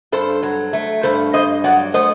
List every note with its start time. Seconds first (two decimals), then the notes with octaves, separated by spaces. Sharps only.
0.12 G2 A4 C5
0.43 F#3
0.73 A3
1.03 G2 A4 C5
1.33 G2 C5 D#5
1.64 F#3 D5 F#5
1.94 A3 C5 D#5